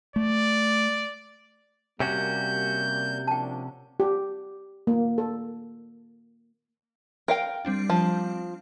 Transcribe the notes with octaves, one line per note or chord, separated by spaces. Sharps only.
A3 D5
C3 G3 A#3 C#4 F#4 G6
F3 A#3 D4 G5 A5
G4
A#3
A4
A#4 F5 G5
G3 C4 D4
F3